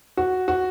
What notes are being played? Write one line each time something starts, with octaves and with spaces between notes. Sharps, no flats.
F#4
F#4